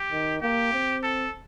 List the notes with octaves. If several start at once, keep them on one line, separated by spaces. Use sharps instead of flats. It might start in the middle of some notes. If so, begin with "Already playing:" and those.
Already playing: G4
D#3
A#3 G4
C4
A4